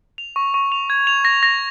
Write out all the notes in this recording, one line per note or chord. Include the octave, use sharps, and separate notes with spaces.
F7
C#6
C#6
F7
G#6
F7
A#6
A#6